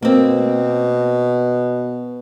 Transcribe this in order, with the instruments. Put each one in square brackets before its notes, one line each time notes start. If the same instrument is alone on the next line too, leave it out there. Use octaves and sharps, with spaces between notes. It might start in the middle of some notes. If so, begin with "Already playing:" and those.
[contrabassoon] B2 [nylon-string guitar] A#3 C4